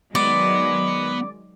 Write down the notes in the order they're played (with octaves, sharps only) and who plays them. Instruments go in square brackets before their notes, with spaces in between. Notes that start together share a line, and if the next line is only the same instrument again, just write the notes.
[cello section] D#3 F#3 G#3 [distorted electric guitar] B3 [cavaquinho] D5